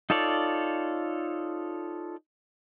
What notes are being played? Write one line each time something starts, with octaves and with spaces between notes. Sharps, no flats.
D#4 F4 A4 C#5 D5